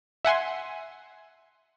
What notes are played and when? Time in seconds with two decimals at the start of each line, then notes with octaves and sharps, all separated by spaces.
0.25 E5 F#5 G#5 C6